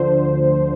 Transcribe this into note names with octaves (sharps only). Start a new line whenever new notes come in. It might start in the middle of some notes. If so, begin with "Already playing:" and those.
Already playing: D2 D3 F3 C5